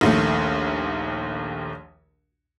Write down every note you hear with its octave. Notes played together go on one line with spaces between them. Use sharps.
A#1 D#2 A3